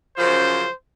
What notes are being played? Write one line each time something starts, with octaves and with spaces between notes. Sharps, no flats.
F#2 C#3 F3 C5